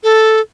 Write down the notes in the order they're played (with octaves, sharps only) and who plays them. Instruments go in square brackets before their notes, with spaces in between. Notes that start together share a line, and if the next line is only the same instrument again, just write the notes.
[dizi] A4